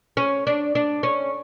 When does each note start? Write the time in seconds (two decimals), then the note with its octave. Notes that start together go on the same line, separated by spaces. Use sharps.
0.17 C#4
0.47 D4
0.75 D4
1.03 C#4